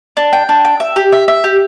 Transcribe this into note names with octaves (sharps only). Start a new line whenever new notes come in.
D4
G5
D4
G5
E5
G4
E5
E5
G4